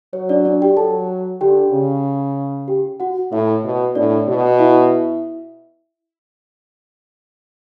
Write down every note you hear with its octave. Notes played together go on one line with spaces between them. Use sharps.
F#3 C#5
D4 D5
D4 D5
G4 G5
F#3 A4 A5
D3 G4 G5
C#3
G4 G5
F#4 F#5
A2 E4 E5
B2
A2 D4 D5
B2
E4 E5